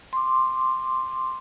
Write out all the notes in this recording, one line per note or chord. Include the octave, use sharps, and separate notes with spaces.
C6 D6